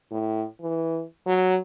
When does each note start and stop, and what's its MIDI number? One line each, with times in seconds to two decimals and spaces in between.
0.11 0.44 45
0.61 1.03 52
1.26 1.58 54